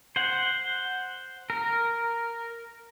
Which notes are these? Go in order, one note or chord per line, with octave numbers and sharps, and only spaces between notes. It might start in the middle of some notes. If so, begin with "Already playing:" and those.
C5 F#5
A#4